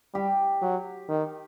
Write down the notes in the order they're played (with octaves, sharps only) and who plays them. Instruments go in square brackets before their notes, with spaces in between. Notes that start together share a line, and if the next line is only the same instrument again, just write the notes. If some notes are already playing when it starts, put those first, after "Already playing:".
[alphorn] G3 [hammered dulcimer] G4
[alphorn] F#3
D#3